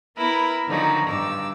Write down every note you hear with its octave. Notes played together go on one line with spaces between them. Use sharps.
B3 E4 A#4 B4
D3 D#3 F3 F#3 D#4
G2 D6 E6